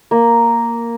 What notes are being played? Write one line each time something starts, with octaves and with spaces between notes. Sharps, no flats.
A#3